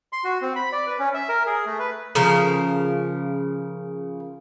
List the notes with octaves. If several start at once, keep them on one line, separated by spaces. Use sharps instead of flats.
C6
F#4
C4
B5
D5
B4
C#4
E5
A#4
G#4
A3
B4
C#3 F3 A#4